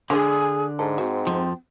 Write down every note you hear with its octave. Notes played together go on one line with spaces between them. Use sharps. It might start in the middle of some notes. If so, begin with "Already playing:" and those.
D3 G#3 D4 G#4 D5
G#2 A4
C4 F#4
F2 F3